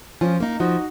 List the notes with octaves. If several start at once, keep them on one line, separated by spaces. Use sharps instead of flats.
F3 C#4 F4
A#3 D#4
F3 D#4 F#4